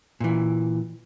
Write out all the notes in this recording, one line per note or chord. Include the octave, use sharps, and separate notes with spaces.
A#2 E3